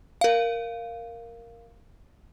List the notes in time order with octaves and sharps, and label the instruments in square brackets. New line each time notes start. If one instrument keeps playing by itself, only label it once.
[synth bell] A#4 F5